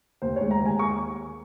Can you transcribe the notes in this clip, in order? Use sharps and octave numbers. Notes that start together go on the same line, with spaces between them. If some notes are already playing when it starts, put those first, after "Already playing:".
D#2 C5
C#5
G#3
A#5
D#2
G#5
C#6